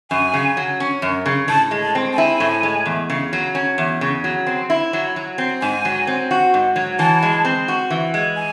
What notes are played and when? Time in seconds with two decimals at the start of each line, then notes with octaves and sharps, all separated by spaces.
0.11 F#2 G#5
0.34 C#3
0.57 F#3
0.80 C#4
1.02 F#2
1.26 C#3
1.48 A2 A5
1.71 G#3
1.83 A5
1.95 C4
2.13 A5
2.17 E4 G#5
2.40 A2
2.63 G#3
2.86 E2
3.10 C#3
3.33 F#3
3.55 C#4
3.78 E2
4.01 C#3
4.24 F#3
4.47 C4
4.70 E4
4.93 F#3
5.16 F#3
5.38 C4
5.61 G#2 G#5
5.85 F#3
6.07 C4
6.31 F#4
6.54 G#2
6.76 F#3
6.99 E3 A5
7.22 G#3
7.45 C4
7.68 F#4
7.90 E3
8.14 G#3
8.36 G#5